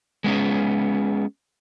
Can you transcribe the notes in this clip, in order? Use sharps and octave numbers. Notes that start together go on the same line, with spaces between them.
G#3 B3 C#4 G#4